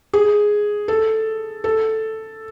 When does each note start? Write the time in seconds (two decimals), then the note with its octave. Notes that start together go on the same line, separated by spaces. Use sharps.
0.13 G#4
0.88 A4
1.64 A4